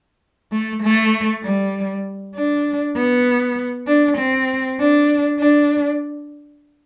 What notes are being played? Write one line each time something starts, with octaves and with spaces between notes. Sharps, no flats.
A3
A3
G3
D4
B3
D4
C4
D4
D4